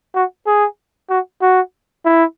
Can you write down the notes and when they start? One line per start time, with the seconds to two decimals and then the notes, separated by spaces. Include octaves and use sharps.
0.15 F#4
0.46 G#4
1.10 F#4
1.42 F#4
2.05 E4